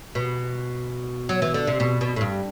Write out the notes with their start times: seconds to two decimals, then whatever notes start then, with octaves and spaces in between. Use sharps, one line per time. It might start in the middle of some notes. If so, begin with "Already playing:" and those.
0.15 B2
1.29 F#3
1.42 E3
1.54 D3
1.67 C3
1.80 B2
2.01 B2
2.16 A2
2.21 G2